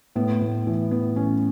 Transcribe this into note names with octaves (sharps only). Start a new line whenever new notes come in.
A2 B3
A2
E3
E3 B3
A2 C#4